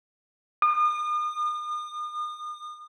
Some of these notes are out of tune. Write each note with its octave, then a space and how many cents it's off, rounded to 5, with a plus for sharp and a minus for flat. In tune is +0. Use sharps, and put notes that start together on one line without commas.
D#6 -40